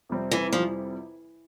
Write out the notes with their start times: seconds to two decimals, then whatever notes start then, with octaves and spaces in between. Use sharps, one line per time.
0.09 F2 C3 G3 C4
0.31 E3
0.52 F2 C3 F3 G3 C4